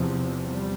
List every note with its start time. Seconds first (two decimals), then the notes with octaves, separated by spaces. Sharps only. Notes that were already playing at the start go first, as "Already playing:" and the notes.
Already playing: E2 C3 F3
0.45 G3